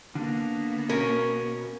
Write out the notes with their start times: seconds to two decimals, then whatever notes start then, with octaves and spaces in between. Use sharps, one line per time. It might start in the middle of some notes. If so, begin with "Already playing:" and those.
0.15 D3 A#3 B3
0.89 B2 C#4 A#4